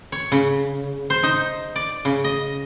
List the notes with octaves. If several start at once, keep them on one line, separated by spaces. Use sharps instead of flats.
C#5
C#3
C5
D#4
D5
C#3
D#5